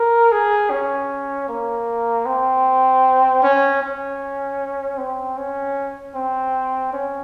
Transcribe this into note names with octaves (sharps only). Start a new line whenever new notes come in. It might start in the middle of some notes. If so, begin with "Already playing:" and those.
Already playing: A#4
G#4
C#4
A#3
C4
C#4
C#4
C4
C#4
C4
C#4